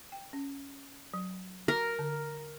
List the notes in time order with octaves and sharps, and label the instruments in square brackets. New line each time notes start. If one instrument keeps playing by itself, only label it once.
[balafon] G5
C#4
F#3
[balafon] F#4 [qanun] A#4
[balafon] D3